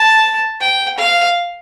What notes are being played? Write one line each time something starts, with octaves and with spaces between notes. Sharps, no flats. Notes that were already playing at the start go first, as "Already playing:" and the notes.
Already playing: A5
G5
F5